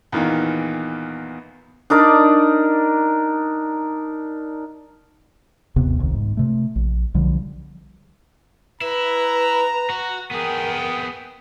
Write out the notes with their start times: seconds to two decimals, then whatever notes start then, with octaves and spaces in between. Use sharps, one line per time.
0.12 E2 A#2 D#3 E3
1.90 D4 D#4 A#4 D5
5.76 G1 D#2 C3 B3
5.98 F1 C2 D#3
6.14 G#2
6.37 C3 A3
6.76 A#1
7.14 B1 D3 F3 G3
8.81 E4 B4 A#5
9.90 F#4
10.31 B3 G#4 A#4 G5